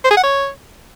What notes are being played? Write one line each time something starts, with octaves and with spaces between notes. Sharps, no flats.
C5
G#4
F#5
C#5